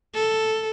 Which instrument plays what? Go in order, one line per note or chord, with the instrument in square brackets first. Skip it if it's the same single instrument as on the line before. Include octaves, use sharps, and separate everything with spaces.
[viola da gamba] A4